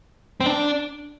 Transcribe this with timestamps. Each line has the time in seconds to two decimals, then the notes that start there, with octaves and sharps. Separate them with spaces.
0.41 C4
0.46 D4